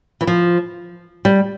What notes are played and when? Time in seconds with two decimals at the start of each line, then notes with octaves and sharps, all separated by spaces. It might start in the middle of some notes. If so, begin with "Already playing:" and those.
0.21 E3
0.27 F3
1.25 G3